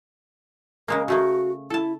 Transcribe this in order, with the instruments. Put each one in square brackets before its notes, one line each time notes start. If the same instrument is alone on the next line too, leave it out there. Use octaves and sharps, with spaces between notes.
[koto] C#3 G#3 A#3 [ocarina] A#4
[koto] C#3 A3 A#3 [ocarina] F#4
[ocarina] E4 [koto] A4 A5